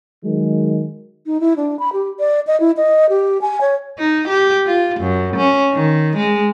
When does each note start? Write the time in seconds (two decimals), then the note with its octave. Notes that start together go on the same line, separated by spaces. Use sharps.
0.25 D#3 F#3 G#3
1.26 D#4
1.40 E4
1.56 D4
1.79 B5
1.93 G4
2.19 D5
2.47 D#5
2.60 E4
2.77 D#5
3.09 G4
3.41 G#5
3.61 C#5
3.98 D#4
4.28 G4
4.66 F4
5.00 F#2
5.36 C#4
5.73 D#3
6.17 G#3